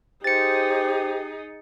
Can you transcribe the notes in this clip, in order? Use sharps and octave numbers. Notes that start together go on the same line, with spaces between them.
D#4 G4 G#4 C5 A6 C#7